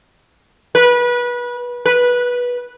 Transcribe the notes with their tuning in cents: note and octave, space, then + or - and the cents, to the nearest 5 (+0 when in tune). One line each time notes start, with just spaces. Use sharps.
B4 -25
B4 -15